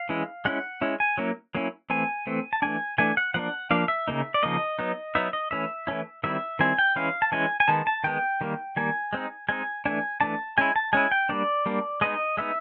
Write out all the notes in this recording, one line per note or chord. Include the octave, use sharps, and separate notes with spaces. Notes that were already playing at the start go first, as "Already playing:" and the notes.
Already playing: F5
E3 G#3 C#4 E4
G#3 C#4 E4 F#5
G#3 C#4 E4
G#5
F#3 A#3 C#4 E4
F#3 A#3 C#4 E4
E3 A3 C4 G#5
E3 A3 C4
A5
E3 A3 D4 G#5
E3 A3 D4 G#5
F#5
F3 A#3 D4 F#5
F3 A#3 D4 F5
E5
C#3 F3 A#3 D#4
D5
C#3 F3 A#3 D#4 D#5
F#3 B3 D#4
F#3 B3 D#4 E5
D#5
E3 A3 C#4 E4 E5
E3 A3 C#4 E4
D#3 G3 C4 E4 E5
D#3 G3 C4 E4 G#5
G5
E3 G#3 C#4 E4 F5
A5
E3 G#3 C#4 E4 G#5
G#5
D#3 G#3 B3 A5
A5
D#3 G#3 B3 G5
D#3 G3 A#3
D#3 G3 A#3 G#5
G#3 C4 D#4
G#3 C4 D#4 G#5
E3 A3 D4 G#5
E3 A3 D4 A5
G#3 C#4 E4 G#5
A5
G#3 C#4 E4 G#5
G5
G3 A#3 D4 D5
G3 A#3 D4
G#3 B3 D#4 D#5
G#3 B3 D#4 E5